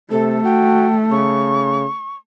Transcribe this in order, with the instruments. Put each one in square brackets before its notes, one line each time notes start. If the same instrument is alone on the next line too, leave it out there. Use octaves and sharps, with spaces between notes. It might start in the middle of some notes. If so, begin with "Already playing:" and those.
[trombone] C3 [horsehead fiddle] A3 [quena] A4
[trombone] F#4 [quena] G5
[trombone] C#3 [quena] C#6